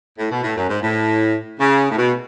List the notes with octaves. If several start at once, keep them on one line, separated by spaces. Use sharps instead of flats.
A2
B2
A2
F#2
G#2
A2
C#3
A2
B2